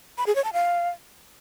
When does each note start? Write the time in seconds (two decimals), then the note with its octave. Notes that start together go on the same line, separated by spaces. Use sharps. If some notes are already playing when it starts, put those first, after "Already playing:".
0.18 B5
0.27 G#4
0.35 C#5
0.44 A5
0.53 F5